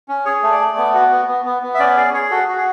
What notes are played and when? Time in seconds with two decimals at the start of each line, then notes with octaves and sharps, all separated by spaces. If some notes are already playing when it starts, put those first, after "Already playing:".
0.08 C#4
0.25 G#4 C#5
0.43 A3
0.51 D5
0.60 A3
0.77 B3
0.94 F#4
1.11 B3
1.28 B3
1.46 B3
1.63 B3
1.74 E5
1.80 C#4 D5
1.97 G#4 D5
2.14 G#4 C#5
2.31 F#4 A4
2.48 F#4
2.57 G#4